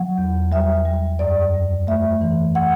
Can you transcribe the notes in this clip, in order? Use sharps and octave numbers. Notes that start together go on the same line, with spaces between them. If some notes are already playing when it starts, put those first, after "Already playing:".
Already playing: F#3 F#5
E2
G3 E5
G3
F#2 D5
G3
A3 E5
E3
F#5